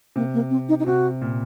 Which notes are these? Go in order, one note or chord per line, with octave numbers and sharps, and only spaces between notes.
C3 A#3
A#3
C4
D#4
D#4
C3 F#4
A#2